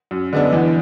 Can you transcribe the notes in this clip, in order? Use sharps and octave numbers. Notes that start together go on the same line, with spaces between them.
F#2
D3 G#3 B3 D4
E2